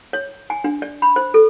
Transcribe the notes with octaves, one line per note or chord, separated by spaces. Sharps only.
C#5
G#5
D4
D5
B5
C5
A4